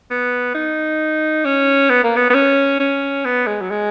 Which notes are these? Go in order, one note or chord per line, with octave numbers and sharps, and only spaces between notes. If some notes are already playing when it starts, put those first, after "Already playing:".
B3
D#4
C#4
B3
A#3
B3
B3
C#4
C#4
B3
G#3
F#3
G#3